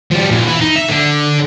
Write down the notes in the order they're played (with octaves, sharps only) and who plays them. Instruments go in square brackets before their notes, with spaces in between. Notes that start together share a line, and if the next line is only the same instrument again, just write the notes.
[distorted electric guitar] F3 G3
A#2 E3
E4 B4
D#4
E5
D3